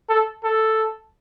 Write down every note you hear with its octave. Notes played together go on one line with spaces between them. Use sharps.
A4
A4